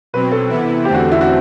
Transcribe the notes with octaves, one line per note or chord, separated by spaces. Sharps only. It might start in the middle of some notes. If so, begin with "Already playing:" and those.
B2 F#3 C4 B4
A4
C3 E3 B3 E4
E2 D3 A3 C4 G4
F#4
E4
F#4